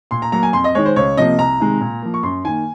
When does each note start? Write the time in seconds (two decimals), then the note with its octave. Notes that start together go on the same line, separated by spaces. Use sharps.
0.11 A#2 C6
0.22 A#5
0.32 F#3 A#3 A#5
0.43 G#5
0.53 F2 C6
0.64 D#5
0.75 D#3 G#3 C#5
0.86 C5
0.96 C#2 C#5
1.17 C3 F3 A#3 D#5
1.38 C2 A#5
1.60 C3 D#3 G#3
1.81 A#2
2.02 F3 A#3
2.14 C#6
2.23 F#2 C6
2.44 D#3 A#3 G#5